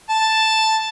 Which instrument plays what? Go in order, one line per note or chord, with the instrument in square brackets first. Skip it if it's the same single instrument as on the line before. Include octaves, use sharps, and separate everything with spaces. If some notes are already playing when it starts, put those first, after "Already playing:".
[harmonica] A5